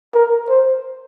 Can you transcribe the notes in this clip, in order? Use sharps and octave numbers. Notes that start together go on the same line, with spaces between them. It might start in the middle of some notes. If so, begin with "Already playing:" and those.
A#4
C5